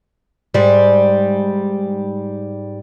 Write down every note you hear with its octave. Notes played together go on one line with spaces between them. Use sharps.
G#2 G3